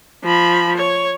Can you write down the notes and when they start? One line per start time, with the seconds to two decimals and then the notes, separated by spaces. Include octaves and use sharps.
0.24 F3 B5
0.76 C#5